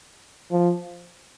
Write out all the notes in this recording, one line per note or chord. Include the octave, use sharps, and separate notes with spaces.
F3